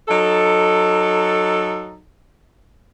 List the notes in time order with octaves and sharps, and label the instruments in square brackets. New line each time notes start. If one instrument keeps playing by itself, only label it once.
[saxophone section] F#3 D#4 A4